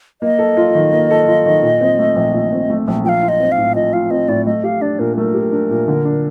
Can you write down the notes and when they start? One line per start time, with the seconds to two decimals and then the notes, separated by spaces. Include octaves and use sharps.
0.22 A#3 D#5
0.39 A4
0.57 F4
0.75 D#3
0.92 A#3
1.11 A4
1.27 F4
1.46 D#3
1.63 A#2
1.81 C4
1.99 A3
2.16 A#1
2.34 A#2
2.52 C4
2.70 A3
2.88 A#1
3.04 F3 G5
3.09 F5
3.23 F4
3.29 D#5
3.40 C4
3.52 F5
3.58 A2
3.75 F3 D#5
3.93 F4 F5
4.11 C4 D#5
4.28 A2 D5
4.46 A3 D#5
4.64 G4 F5
4.81 D4 D5
4.99 A#2 A#4
5.17 A3 A#4
5.34 G4
5.52 D4
5.71 A#2
5.88 D3
6.05 D4